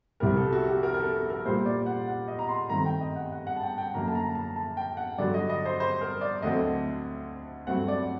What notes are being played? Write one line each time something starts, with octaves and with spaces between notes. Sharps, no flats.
C2 C3 G3 A#4
A4
F#4
G4
A#4
A#4
A4
A4
A#4
A#2 G3 A#3 C5
D5
F#5
F#5
D#5
A#5
C6
G2 D#3 A3 C4 A#5
G5
D#5
F#5
F#5
F#5
A5
G5
G5
F#2 D3 F#3 A#3 A#5
A5
A#5
A5
A5
G5
F#5
G2 D3 F#3 D5
D#5
D#5
C5
C5
A#4
D5
D2 D3 F#3 A3 C4 D#5
G2 F#3 A3 C4 F#5
D5